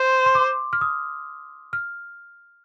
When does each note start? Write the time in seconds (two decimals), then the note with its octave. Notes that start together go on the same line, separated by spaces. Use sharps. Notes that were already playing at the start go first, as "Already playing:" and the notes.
Already playing: C5 C6
0.26 C6
0.35 D6
0.73 F6
0.81 D#6
1.73 F6